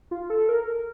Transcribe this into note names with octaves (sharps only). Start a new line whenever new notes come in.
F4
A4
A#4
A#4